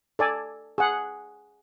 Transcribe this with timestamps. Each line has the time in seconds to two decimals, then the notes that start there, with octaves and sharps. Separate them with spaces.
0.19 A4 D5 G#5
0.78 G#4 F#5